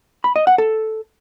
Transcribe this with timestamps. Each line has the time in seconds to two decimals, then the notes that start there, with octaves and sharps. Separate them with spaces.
0.24 B5
0.36 D#5
0.47 F#5
0.58 A4